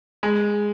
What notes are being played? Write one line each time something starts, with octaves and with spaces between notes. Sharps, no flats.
G#3